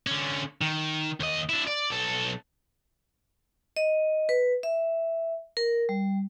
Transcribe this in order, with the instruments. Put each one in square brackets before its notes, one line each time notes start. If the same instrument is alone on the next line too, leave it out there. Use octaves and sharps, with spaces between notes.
[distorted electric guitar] D3 C#4
D#3
D#2 D#5
D4 E4
D5
B1 A4
[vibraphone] D#5
B4
E5
A#4
G3